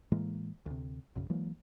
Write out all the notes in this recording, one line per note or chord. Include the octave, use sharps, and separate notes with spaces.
A2 E3 G#3 A#3
D2 C3
A#1 F#2 C#3
E3 F#3 G#3 A#3